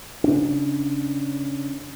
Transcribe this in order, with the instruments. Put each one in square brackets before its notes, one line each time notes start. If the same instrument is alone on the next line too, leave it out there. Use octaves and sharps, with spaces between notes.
[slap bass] C#3 C#4 D4